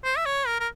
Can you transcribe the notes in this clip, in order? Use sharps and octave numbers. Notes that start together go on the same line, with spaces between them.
C5
E5
C#5
A#4
A#4